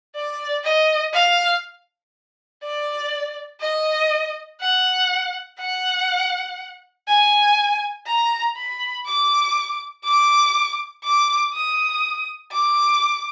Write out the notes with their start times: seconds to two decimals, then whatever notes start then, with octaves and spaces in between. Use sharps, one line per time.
0.15 D5
0.63 D#5
1.14 F5
2.63 D5
3.61 D#5
4.61 F#5
5.59 F#5
7.07 G#5
8.06 A#5
8.56 B5
9.06 D6
10.04 D6
11.04 D6
11.54 D#6
12.52 D6